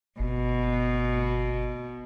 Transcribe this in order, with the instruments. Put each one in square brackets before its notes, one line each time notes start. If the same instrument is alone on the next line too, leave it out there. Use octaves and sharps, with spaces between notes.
[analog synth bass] G1 [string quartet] B2